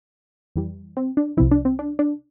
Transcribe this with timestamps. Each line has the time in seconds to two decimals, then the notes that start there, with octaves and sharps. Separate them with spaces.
0.56 F2 E3 G3
0.97 C4
1.17 D4
1.37 C2 C3 F3 C4 E4
1.51 D4
1.65 C4
1.79 D4
1.99 D4